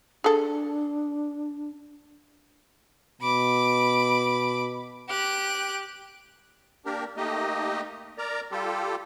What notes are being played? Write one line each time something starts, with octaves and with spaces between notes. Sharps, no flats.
D4 G#4 A4
B2 B5 D6
G4 F#6
A#3 D4 G4 A#4
A3 A#3 D#4 G4 D#5
A#4 D5 A#5
G3 F4 G4 A4